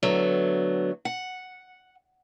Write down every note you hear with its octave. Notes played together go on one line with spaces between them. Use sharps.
D3 F#3 A3 B3
F#5